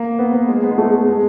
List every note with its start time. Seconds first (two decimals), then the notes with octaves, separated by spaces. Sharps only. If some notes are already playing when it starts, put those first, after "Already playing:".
Already playing: A#3
0.19 B3
0.34 B3
0.48 G#3
0.63 B3
0.71 G#3
0.78 A3
0.93 A3
1.07 G#3